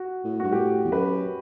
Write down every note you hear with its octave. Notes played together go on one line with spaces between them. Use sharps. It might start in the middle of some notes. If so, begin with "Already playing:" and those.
Already playing: F#4
A2
G2 F#4
A2 G4
E2
F#2 B4